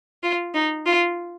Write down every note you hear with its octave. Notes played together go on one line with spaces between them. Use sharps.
F4
D#4
F4